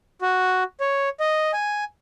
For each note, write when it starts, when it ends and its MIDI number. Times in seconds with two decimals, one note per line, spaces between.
0.22 0.63 66
0.81 1.09 73
1.20 1.51 75
1.53 1.84 80